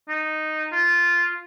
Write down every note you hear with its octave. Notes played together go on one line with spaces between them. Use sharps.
D#4
F4